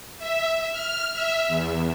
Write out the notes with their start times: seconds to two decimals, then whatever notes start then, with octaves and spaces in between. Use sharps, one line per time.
0.19 E5
0.71 F6
1.13 E5
1.48 E2